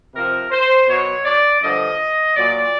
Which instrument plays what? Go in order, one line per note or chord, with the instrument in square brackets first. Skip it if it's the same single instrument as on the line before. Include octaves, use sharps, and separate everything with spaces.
[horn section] C3 F3 A#4
C5
B2 F#3 C#5
D5
G2 D3 F3 D#5
A#2 F#3 D5